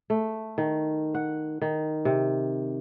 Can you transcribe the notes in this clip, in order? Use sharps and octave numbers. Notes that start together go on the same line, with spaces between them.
A3
D#3
F#5
D#3
C3